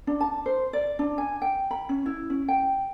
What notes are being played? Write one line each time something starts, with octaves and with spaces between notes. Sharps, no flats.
D4
A5
C5
D5
D4
G#5
G5
B5
C#4
E4
C#4
G5